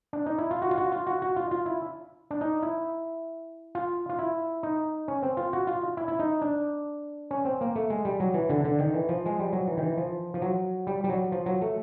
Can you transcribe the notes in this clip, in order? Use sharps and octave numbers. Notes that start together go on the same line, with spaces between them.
D4
D#4
E4
F4
F#4
F4
F#4
F4
F#4
F#4
F4
F4
E4
D4
D#4
E4
F4
F4
E4
D#4
C#4
C4
F4
F#4
F4
E4
E4
D#4
D4
C#4
C4
A#3
A3
G#3
G3
F#3
E3
D3
D3
D#3
E3
F3
G#3
G3
F#3
E3
D#3
E3
F3
F3
F#3
G3
G3
F#3
F3
F#3
A3